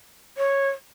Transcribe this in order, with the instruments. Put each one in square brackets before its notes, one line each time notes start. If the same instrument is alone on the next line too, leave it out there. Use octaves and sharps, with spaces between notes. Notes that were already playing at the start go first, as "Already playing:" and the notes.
[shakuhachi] C#5